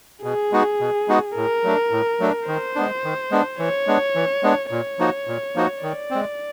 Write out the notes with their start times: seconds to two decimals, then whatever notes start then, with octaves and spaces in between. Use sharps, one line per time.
0.24 B2 G#4
0.52 G#3 B3 D#4 F#4
0.80 B2
1.08 G#3 B3 D#4 F#4
1.36 A2 A#4
1.64 F#3 A3 D4
1.91 A2
2.20 F#3 A3 D4
2.47 D#3 C5
2.75 G#3 B3 D4
3.04 D#3
3.31 G#3 B3 D4
3.59 E3 C#5
3.87 G#3 B3 D4
4.15 E3
4.43 G#3 B3 D4
4.71 A#2 C#5
4.99 F3 A#3 D#4 F#4
5.27 A#2
5.56 F3 A#3 D#4 F#4
5.82 D#3 D5
6.11 G#3 C4